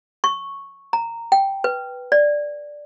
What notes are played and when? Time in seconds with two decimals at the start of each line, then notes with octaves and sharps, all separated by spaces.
0.24 C#6
0.93 A#5
1.32 G5
1.64 B4
2.12 D5